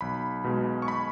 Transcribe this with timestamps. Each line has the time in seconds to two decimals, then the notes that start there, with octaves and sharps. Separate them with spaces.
0.01 B1 B5
0.44 B2 G#3
0.82 C#6
0.88 B5